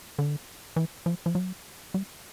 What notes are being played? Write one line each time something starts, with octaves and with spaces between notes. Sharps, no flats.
D3
E3
F3
F3
F#3
G3